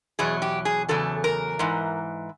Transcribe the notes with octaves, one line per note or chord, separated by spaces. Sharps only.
E2 B2 F#3 G#4
G4
G#4
E2 C#3 F#3 A4
A#4
G#2 E3